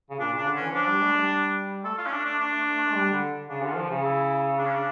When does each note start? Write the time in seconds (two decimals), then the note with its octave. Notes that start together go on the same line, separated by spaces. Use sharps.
0.10 C#3
0.20 A#2 D4
0.34 C#3 D4
0.47 D3
0.56 E3 C#4
0.74 F3 D4
0.88 G3
1.02 A3
1.16 G3
1.84 A3 A4
1.98 F4
2.06 C#4
2.12 D4
2.25 D4
2.39 D4
2.94 G3
3.13 D3
3.49 C#3 D4
3.63 D3 F4
3.76 F3
3.90 C#3
4.04 E4
4.58 D4
4.66 C#4
4.74 D4